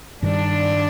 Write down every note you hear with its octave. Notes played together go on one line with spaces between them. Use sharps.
G2 D#3 G3 D4